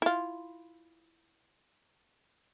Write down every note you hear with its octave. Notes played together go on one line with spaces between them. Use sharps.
E4 F4